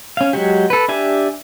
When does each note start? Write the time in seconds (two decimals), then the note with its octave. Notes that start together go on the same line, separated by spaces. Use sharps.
0.17 C#4 F5
0.33 F#3 G#3 F#4 G4
0.70 A4 B4
0.88 D4 G4 E5 G#5